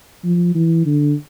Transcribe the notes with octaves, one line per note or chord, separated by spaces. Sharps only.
F3
E3
D3